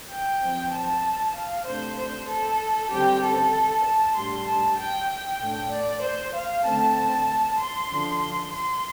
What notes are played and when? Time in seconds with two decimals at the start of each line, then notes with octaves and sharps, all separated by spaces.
0.10 G5
0.41 F3 C4
0.72 A5
1.35 F5
1.65 C3 A3 D4 C5
1.97 C5
2.28 A4
2.90 D3 G3 C4 G4
3.22 A4
3.84 A5
4.15 A2 G3 D4 C6
4.46 A5
4.77 G5
5.09 G5
5.40 A2 A3 D4
5.71 D5
6.02 C5
6.34 F5
6.64 D3 A3 C4 A5
7.58 C6
7.89 D3 F3 D4
8.21 C6
8.53 C6